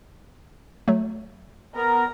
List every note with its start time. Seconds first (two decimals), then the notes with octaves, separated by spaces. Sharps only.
0.88 F#3 A3
1.75 B3 A#4 A#5